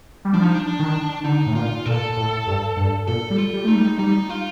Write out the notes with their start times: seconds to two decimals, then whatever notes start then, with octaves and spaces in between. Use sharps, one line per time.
0.25 G3
0.34 F3 D4
0.43 D#4
0.54 D4
0.79 D#3
1.24 D3 D#4
1.46 A2
1.55 A#2 F4
1.85 A#2 A4
2.17 A2
2.47 G2
2.77 G2
3.07 A#2 A4
3.31 G3
3.38 F4
3.53 G3
3.64 A3 D#4
3.75 G3
3.99 G3 D#4
4.29 F4